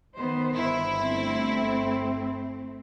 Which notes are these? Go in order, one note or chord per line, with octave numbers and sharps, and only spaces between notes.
D#3 B3 C5
G1 E4
A3 C4